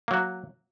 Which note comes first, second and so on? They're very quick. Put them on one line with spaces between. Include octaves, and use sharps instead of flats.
A#3 F#3 F#4